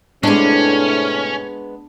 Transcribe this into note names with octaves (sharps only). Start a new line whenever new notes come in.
A2 C3 G#3 B3 C#4 D4